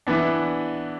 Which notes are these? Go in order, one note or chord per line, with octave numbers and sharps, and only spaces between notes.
E3 B3 D4